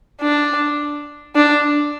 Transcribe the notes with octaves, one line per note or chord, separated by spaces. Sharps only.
D4
D4